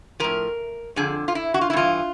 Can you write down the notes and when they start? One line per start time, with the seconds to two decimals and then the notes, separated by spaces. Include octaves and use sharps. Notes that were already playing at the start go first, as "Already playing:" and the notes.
0.20 A2 F3 A#4
0.96 F2 D3 F3 G#4
1.28 F4
1.35 E4
1.54 F#4
1.61 F4
1.70 E4
1.73 G2 E3 F4